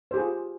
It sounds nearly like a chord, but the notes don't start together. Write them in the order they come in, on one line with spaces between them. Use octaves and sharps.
C5 G4 G#4 F4